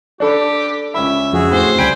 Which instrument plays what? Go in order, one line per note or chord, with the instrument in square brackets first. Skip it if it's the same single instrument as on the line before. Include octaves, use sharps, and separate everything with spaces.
[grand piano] D4 A4 B5 [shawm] G4
[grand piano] C#2 C#4 B5 [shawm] E5
[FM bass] F2 [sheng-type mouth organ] F#4 G#4
[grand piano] A2 C4 [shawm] C5
[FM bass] C#2 [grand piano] G3 G4 D7 [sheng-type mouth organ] G5 G#5 B5